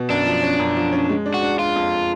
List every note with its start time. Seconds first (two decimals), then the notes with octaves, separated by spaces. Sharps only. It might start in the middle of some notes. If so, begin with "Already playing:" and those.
Already playing: B2
0.09 F#2 D4
0.26 F3
0.42 C#4
0.59 F#2
0.76 F3
0.92 C#4
1.09 G#3
1.26 D4
1.34 F#4
1.42 D4
1.59 D4 F4
1.76 F2